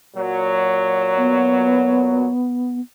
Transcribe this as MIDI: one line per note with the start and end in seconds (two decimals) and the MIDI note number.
0.16 2.28 46
0.16 2.28 54
1.16 2.80 59